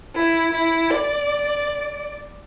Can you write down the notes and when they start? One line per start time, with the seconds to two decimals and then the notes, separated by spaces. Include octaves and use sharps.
0.15 E4
0.53 E4
0.91 D5